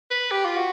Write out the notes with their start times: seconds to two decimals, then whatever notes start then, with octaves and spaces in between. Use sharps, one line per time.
0.11 B4
0.31 G4
0.45 F4
0.57 F#4